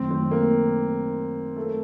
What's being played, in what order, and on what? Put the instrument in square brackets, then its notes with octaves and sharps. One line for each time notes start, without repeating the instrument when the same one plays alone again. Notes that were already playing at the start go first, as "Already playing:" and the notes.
Already playing: [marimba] F#2 D#3 F#3 A3 [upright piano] C4
[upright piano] C4
A#3
A3